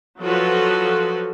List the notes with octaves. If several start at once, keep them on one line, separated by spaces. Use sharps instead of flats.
F3 F#3 F4 F#4 A4 B4